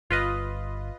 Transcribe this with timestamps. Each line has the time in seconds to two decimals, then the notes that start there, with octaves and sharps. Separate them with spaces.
0.10 G1 F4 B4 D#5